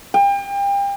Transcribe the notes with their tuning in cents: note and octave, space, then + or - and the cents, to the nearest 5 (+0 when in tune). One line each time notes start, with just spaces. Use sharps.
G5 +35